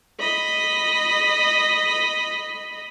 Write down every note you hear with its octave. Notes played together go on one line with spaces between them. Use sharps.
D#5 B5